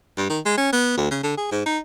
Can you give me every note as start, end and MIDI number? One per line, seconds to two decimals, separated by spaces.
0.17 0.26 43
0.29 0.39 51
0.46 0.54 56
0.57 0.72 61
0.73 0.93 59
0.97 1.09 38
1.11 1.19 49
1.23 1.37 50
1.38 1.51 68
1.52 1.62 44
1.66 1.79 63